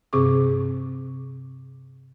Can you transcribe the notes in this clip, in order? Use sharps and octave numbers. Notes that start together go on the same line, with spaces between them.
G2 C3 C4 G#4 C#6 D6